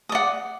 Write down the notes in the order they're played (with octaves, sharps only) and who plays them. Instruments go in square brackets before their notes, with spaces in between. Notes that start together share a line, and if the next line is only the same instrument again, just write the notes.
[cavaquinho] D#6
D5
F#5